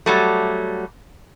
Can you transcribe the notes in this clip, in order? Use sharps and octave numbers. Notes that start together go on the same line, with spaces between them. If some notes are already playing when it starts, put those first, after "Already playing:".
F#3 G3 A3